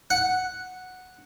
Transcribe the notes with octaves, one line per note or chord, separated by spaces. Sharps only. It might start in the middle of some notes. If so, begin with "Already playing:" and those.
F#5